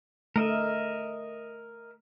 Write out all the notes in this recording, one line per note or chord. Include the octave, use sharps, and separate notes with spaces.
A3 A#4 D#5 E5